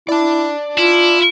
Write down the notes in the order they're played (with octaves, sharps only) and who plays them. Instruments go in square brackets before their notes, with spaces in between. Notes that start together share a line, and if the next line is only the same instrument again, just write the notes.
[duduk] E4 [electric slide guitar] D5 A5
[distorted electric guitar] E4 [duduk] F4